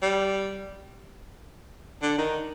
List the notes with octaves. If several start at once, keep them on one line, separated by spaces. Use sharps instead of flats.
G3
D3
D#3